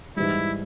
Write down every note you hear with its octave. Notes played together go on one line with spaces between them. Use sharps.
G#2 E3 G3 E4